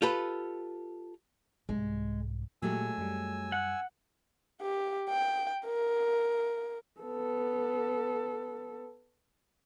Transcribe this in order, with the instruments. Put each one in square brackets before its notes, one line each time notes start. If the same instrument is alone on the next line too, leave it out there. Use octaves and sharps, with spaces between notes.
[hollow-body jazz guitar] F4 G4 A4 B4
[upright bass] C2 G#2 [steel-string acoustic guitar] G#3
[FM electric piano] A#2 G4 [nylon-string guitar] F#3 G#3 A3 [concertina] G#5 E6
[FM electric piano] F#2 G3
[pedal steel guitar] F#5
[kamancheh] G4
G5
A#4
[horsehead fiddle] B3 A4